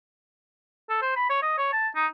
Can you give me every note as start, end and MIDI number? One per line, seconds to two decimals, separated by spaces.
0.89 0.99 69
1.02 1.13 72
1.16 1.28 83
1.30 1.41 73
1.43 1.55 75
1.58 1.73 73
1.73 1.88 81
1.95 2.06 63